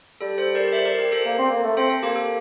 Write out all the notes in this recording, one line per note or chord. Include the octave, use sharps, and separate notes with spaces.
G3 A4
A4 C5
A#4 D5
D5
C5 E5
A#4 D5
G4 A#4
A4 C5
A#3
C4
A#3
A3
C4 A4 C5
A4
A#3 G4
A4